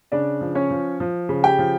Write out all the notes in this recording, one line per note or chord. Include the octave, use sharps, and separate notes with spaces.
C#3 D4 D5
F3
C#4 C#5
F3
F3
C#3
G4 G5
F3